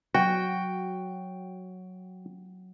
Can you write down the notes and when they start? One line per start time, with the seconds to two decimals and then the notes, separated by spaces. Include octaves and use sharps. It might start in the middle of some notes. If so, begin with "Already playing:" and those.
0.15 F#3 F#4 G5